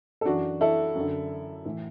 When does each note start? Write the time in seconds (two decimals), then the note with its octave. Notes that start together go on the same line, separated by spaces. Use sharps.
0.21 A4
0.25 F#2 E3 D4 F#4
0.61 E4 A4
0.95 F#2
1.00 D3
1.65 A2 E3